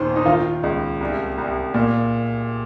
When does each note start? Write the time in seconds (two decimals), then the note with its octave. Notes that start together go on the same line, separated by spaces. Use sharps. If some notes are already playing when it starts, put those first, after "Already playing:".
Already playing: D#2 A#2 D#3 C5
0.16 D#4
0.25 D#3 F4
0.63 C#2
1.01 C2
1.38 C2
1.74 A#2